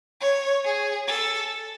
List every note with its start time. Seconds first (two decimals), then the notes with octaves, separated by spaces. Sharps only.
0.21 C#5
0.64 G#4
1.07 A4